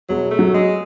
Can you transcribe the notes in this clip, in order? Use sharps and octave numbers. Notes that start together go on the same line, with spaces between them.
E1 F#3
A3
F#3
G#3